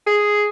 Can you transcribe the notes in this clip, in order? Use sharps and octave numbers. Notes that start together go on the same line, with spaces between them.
G#4